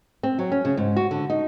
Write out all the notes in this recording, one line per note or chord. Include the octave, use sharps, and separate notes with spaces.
C4
F#3
C#4
C#3
G#2
F#4
D3
D#4